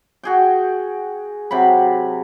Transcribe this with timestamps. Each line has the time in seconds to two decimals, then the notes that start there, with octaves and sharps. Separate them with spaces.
0.23 F#4 G#4 G5
1.51 C3 F#3 B5